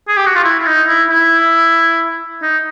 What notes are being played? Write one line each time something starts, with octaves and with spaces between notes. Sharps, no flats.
G#4
G4
F#4
F4
E4
E4
D#4
E4
E4
D#4